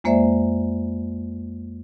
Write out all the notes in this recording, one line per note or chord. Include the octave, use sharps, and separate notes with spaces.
F2 G#3 A#3 C5 D5 E5